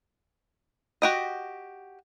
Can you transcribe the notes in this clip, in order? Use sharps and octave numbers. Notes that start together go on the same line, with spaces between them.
F#4 G4 D#5